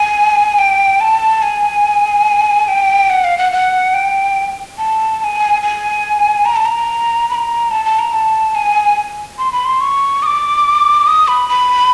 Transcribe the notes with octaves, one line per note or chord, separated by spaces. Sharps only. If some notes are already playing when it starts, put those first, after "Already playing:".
Already playing: G#5
G5
A5
G#5
G5
F#5
F5
F#5
F#5
G5
A5
A5
G#5
G#5
A#5
A5
A#5
B5
A#5
A5
A5
A#5
A5
G#5
C6
B5
C6
C#6
D#6
D6
D#6
B5
B5